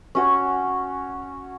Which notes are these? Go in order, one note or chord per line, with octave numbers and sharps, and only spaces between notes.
C#4 F#4 C#5